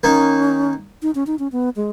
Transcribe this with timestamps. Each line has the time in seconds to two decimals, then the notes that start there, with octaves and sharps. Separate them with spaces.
0.03 D#3 A#3 C#4 D#4
1.02 D#4
1.15 C#4
1.27 D#4
1.39 C#4
1.52 B3
1.76 G#3